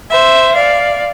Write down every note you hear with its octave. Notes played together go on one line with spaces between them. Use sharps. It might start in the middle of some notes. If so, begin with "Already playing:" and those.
C5 E5
D5 F5